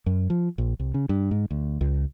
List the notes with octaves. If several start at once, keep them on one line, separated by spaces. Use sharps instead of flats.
F#2
F3
A#1
C2
C#3
G2
G#2
D2
C#2